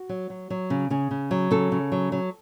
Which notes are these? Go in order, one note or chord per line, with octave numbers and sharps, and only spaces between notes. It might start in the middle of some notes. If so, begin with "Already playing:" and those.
Already playing: F#4
F#3
F#3
F#3
C#3
C#3 G#4
C#3
F#3
C#3 A4
C#3
F#3
F#3